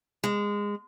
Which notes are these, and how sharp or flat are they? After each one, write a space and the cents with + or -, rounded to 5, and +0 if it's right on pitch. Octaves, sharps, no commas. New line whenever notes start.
G#3 -20